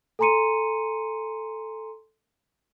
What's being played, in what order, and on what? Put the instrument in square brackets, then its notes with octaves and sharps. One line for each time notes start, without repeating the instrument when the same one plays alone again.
[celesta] A4 G#5 A#5 C6 C#7 D#7